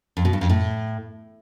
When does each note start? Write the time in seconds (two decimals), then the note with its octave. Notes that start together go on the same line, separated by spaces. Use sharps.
0.17 F2
0.25 B2
0.33 G2
0.41 F2
0.49 A2